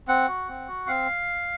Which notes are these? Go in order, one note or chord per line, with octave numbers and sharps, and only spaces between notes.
C4 F#5
F#4
C4
F#4
C4 F5